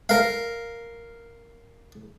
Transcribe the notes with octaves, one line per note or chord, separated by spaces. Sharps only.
A#4 F5